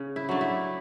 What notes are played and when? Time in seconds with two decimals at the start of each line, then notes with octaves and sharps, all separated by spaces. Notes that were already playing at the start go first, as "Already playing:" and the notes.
Already playing: C#3
0.16 E4
0.29 F#3 A3 D4
0.41 E4